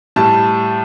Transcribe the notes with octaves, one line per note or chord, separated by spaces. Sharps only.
A2 G3 A5